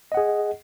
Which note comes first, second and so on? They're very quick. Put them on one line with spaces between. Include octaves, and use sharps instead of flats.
D#5 F#5 G#4